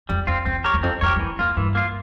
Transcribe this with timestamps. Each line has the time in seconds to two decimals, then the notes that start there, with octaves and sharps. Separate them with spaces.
0.09 F2 G3
0.27 E2 C4 F4
0.46 E2 C4
0.64 G4 A#4 C#5
0.74 E2
0.83 F2 C4
1.01 F2 G4 A#4 C#5
1.16 E2
1.20 F2 E3
1.39 F2 A#3 F4
1.57 G2 E3
1.75 A#3 F4